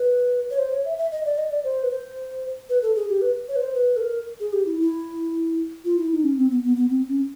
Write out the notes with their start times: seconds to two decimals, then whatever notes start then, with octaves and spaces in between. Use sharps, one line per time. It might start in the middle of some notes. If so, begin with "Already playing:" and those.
Already playing: B4
0.51 C#5
0.58 C5
0.72 C#5
0.85 E5
0.98 E5
1.12 D#5
1.25 D5
1.38 D#5
1.51 D5
1.64 C5
1.83 B4
1.90 C5
2.69 B4
2.82 A4
2.96 G#4
3.09 G4
3.22 B4
3.49 C#5
3.56 B4
3.61 C5
3.75 B4
3.97 A4
4.01 A#4
4.40 G#4
4.53 G4
4.66 E4
4.80 E4
5.85 F4
5.98 E4
6.12 D#4
6.24 C#4
6.37 C4
6.51 B3
6.63 B3
6.77 B3
6.90 C4
7.08 C#4